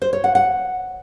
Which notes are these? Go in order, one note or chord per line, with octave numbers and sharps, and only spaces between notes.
C5
C#5
F#5
F#5